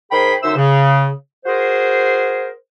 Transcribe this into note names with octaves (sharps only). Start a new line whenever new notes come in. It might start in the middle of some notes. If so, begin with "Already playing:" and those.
D#3 G#4 C5 G5 B5
F#2 D3 D#4 C5 E5 E6
C#3
F#4 G#4 A#4 C5